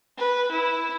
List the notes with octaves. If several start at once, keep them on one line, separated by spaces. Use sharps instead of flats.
B4
E4